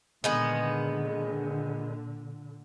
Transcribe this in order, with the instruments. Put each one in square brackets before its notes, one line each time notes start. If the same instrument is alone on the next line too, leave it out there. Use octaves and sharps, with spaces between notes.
[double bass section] A#2 D3 [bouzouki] D#3 G#3 B3